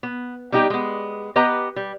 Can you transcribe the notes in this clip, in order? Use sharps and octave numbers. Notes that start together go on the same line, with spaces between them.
B3
G3 B3 D#4 G4
G#3 B3
B3 G4 B4 D#5 A#5
G3